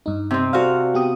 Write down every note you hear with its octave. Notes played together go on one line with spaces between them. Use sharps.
G2 D#4
C3 C4
F#4 A4 C5 D5 F5
B3 G4 D#6